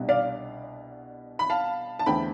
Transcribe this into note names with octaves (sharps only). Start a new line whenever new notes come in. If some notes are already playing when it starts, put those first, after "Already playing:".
Already playing: C2 B2 B3 D4
D5 F5
B5
F5 A5
A5
E2 D3 A3 C4 G5 B5